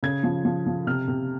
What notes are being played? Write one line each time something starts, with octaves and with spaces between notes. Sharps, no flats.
C#3 G#6
F3
F3
F3
C3 F6
C3